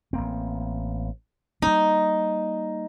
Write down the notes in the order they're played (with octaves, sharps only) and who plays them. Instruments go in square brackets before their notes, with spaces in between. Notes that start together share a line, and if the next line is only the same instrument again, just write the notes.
[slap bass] A1 A#3 C4
[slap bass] G3 A#3 [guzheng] D#4